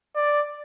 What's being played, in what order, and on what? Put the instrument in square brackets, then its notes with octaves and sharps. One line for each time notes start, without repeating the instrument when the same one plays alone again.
[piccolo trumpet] D5